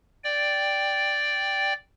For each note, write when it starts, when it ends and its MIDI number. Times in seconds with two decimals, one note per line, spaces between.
0.24 1.73 74
0.24 1.73 79